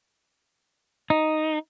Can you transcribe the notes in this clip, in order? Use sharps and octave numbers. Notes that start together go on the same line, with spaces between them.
D#4